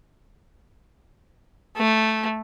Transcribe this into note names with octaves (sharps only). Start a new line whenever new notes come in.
A3